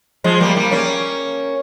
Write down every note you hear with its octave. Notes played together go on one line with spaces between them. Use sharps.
F3 G#3
G3 A#3
G3 A#3
A#3 C#4